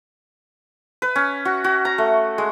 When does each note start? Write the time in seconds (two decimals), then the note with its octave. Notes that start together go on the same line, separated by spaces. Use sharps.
1.02 B4
1.16 C#4
1.45 F#4
1.64 F#4
1.85 A#5
1.98 A3
2.38 G#3